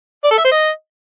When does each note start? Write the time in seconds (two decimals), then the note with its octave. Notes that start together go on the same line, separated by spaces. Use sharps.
0.24 D5
0.31 A4
0.38 E5
0.45 C5
0.51 D#5